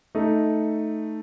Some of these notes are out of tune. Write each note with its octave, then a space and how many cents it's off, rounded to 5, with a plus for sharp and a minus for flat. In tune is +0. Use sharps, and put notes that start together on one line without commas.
A3 +0 D#4 +0